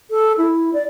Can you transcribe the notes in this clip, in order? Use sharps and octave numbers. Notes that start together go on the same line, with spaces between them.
A4
E4
D5